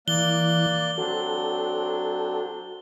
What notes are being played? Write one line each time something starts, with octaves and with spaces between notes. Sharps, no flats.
E3 A#3 D5 F#6 G7
F#3 C4 D4 F#4 A4